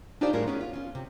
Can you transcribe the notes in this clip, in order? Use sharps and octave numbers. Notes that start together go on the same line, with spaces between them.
D4 D#4 F4 G4 C5 D5
A2 G3 G#3 F4 A#4
B3 C#4 G#4
F4
C#4 F4
C3